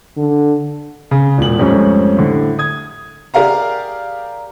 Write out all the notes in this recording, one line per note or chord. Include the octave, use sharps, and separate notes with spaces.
D3
C#3
E1 A#2 F#7
F2 G#2 G3 A3 C#4
A2 D3
D#6 G#6
G4 G#4 A#4 D5 F5 A#5